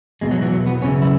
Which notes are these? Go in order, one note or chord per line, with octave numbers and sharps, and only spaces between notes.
E2 B2 G#3
F#3
E3
F#3
B3
F#2 C#3 E3 C#4
E4